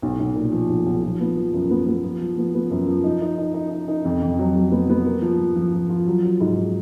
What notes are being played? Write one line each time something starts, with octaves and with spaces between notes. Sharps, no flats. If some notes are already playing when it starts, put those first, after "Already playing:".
B1
B1
A#2
F3
B1
B1
F3
B3
F3
F#2
B3
B3
F3
F3
B3
B3
F#2
F3
D#4
D#4
D#4
D#4
D#4
D#4
F2
F2
F#3
F#3
B3
B3
A#3
F3
F3
F3
F3
F4
F#3
F#3
G#2